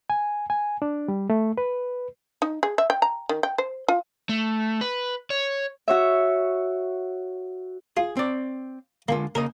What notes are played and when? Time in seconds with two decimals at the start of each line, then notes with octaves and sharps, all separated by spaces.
0.10 G#5
0.50 G#5
0.82 D4
1.08 G3
1.30 A3
1.58 B4
2.42 D#4
2.63 G#4
2.78 E5
2.90 G5
3.02 A#5
3.29 D#3
3.43 G5
3.58 C5
3.88 F4
4.29 A3
4.81 B4
5.30 C#5
5.88 F#4 C#5 E5
7.97 F4 G#4
8.17 C4 D5
9.08 D3 G#3 A#3 F4
9.35 C#3 A#3 A#4 D#5